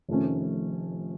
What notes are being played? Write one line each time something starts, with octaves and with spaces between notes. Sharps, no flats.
F1 F2 D#3 A3 C#4